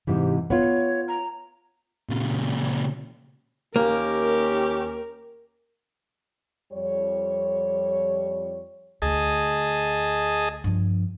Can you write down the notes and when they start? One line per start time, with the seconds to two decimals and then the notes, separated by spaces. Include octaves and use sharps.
0.07 G#2 C3 E3 G4
0.50 B3 F4 C#5
1.08 A#5
2.10 A#2 C#3
3.76 D#2 A#3 C#4 G4 A#4
6.73 F2 G3 C#5
9.02 D2 D3 G#4 D#5 A5
10.64 G2 F3